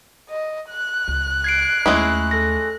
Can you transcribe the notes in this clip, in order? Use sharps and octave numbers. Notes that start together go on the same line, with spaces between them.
D#5
F#6
C#2
G#6 C7 D7
D#2 G#3 A3 C#4 E4
A4 A#6